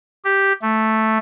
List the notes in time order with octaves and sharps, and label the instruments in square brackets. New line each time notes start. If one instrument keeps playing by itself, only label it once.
[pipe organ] G4
A3